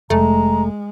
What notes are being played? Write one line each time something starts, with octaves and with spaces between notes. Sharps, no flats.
F1 G#3 A3 A#5